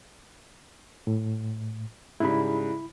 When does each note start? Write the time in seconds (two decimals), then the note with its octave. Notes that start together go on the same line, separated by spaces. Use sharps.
1.07 A2
2.20 G#2 C#3 G3 E4 B5